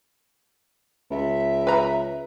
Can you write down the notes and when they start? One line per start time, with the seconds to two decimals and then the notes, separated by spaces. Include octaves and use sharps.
1.11 C#2 E5
1.67 B4 A#5